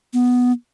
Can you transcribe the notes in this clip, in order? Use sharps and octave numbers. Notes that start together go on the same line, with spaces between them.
B3